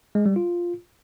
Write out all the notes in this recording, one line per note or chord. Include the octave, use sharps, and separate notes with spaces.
G#3
G3
F4